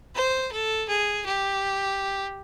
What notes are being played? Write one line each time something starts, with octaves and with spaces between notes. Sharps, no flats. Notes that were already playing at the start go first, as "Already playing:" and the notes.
C5
A4
G#4
G4